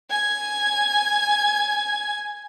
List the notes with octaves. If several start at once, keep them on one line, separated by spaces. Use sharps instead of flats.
G#5 G#6